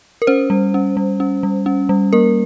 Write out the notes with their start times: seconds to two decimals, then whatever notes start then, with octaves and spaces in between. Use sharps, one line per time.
0.22 A#4
0.27 C#4 C5
0.50 G3
0.74 C#4
0.97 G3
1.20 C#4
1.43 G3
1.66 C#4
1.89 G3
2.13 A#3 A#4